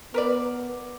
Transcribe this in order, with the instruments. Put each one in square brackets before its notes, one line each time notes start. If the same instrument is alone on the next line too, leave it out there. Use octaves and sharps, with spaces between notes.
[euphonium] B3 [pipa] A#4 B4 D5